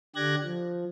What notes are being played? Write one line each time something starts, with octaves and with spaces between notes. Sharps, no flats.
D3 G4 D5 F#6 G#6 A#6
F3